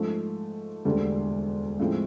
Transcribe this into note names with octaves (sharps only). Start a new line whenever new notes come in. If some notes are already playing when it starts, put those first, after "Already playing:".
Already playing: G#2 F3 A3
E1 D2 D3 G3
A2 F3 G#3 C4